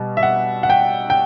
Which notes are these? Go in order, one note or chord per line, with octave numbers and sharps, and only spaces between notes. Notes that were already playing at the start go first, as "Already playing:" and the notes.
Already playing: B2 G3
E5
F#5
F#5
G5
G5